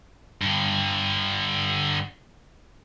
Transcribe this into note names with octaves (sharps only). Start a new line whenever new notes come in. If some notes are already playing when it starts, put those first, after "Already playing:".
G2 D3